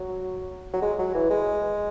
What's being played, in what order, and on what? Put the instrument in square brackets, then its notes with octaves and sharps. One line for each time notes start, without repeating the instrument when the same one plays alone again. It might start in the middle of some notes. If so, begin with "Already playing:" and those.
Already playing: [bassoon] F#3
F#3
G#3
F#3
E3
G#3